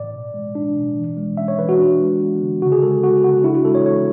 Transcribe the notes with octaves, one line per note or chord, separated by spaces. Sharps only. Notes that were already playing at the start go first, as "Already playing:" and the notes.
Already playing: A2 D5
B2
G#3
D4
B2
E3
G#3
C#4 E5
C#5
E3 B4
F#4
D4
G#3
B3
D3
C#3 F#4
G#4
G#3 A4
B3 F#4
C#3 F#4
D4 E4
F#4
G#3 A4
C#5
B3 C#5